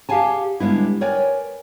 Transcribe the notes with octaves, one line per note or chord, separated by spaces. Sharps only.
G4 G#4 F5 F#5 G#5 A5
D3 G3 G#3 B3 E4
A#4 B4 C#5 D5 G5 G#5